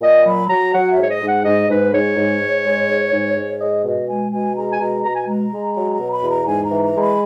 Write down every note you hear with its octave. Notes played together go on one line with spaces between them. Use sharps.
A#2 D#5
F#3 B5
F#3 A#5
F#3 F#5
E5
G#2
C#5
D#5
G#2
F#5
G#2 D#5
G#2 B4
G#2 C#5
G#2
G#2
G#3
G#2
G#2
G#2
G#3 D#5
B2 D#5
G#3 G#5
B2 G#5
G#3 A#5
G#5
B2 A#5
B2 A#5
G#5
G#3 A#5
G#3
F#3 A#5
A#5
B2
B5
E2
A#5
G#2 G#5
A#5
E3
A#5
G#3
B5